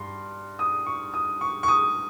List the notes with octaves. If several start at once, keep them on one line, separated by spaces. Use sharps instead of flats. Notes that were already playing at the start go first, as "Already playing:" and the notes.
Already playing: G2 C6
D#6
C#6
D#6
C#6
C#6
D#6